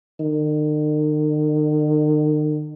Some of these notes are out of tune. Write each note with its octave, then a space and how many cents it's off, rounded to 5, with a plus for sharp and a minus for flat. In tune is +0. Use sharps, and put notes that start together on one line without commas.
D#3 -45